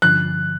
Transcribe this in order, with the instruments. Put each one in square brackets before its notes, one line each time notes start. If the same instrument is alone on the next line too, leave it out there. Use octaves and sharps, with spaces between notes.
[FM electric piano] G2 D3 F3 [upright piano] F#6